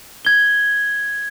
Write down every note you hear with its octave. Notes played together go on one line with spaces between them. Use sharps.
G#6 G7